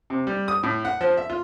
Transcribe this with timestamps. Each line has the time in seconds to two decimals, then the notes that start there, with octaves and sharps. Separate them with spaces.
0.10 C3
0.27 G3
0.48 D#6
0.63 A2
0.85 F#5
1.01 F3
1.17 E5
1.30 F4